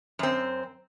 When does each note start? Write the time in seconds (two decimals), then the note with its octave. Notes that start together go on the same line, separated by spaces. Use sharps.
0.19 F#2 C4